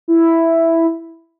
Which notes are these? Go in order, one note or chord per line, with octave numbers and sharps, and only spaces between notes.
E4